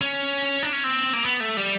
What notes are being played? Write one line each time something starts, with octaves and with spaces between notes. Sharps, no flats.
C#4
D4
C#4
C4
A#3
B3
A3
G3